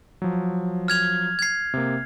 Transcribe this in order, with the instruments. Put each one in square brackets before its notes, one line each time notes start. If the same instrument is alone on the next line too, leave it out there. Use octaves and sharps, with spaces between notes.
[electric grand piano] F3 F#3
[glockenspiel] F6 G#6 F7
G#6 C7
[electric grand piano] C3 A#3